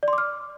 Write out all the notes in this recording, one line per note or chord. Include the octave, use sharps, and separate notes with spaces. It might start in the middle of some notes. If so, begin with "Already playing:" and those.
D5
C6
D6
F6